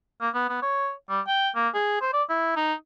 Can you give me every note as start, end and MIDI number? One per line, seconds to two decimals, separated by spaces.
0.21 0.29 58
0.34 0.49 59
0.50 0.61 59
0.62 0.92 73
1.09 1.20 55
1.27 1.49 79
1.55 1.68 58
1.74 2.01 68
2.01 2.13 72
2.13 2.23 74
2.29 2.51 64
2.56 2.74 63